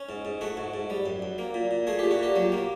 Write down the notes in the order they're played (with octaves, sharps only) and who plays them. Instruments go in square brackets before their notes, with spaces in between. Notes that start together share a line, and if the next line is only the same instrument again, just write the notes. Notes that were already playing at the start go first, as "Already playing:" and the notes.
Already playing: [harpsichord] C#4
G#2
G#2
A3 F#4
G#2
G#2
G3
F#2
F#2
A#3
A#2
A#2
A3 G#4
A#2 G4
F#4
A#2 G4
F#3
A#3